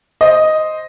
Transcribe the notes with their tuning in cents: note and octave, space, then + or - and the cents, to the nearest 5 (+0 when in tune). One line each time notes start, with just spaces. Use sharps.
C5 +0 D#5 +0